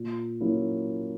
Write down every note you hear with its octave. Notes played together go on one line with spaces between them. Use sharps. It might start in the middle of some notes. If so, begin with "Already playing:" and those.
Already playing: A#2
F#3 A#3 C#4 E4